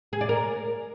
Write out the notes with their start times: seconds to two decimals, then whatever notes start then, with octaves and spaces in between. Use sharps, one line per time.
0.13 G#4
0.21 D5
0.29 A#4